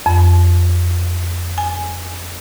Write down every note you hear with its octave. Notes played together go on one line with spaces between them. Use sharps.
F2
G#5